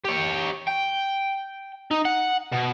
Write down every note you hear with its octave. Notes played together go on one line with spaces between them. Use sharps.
G4 C#5
G5
D#4
F#5
B2